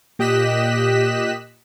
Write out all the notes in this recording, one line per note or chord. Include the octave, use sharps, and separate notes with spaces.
A#2 G4 D#5 F#6 B6 E7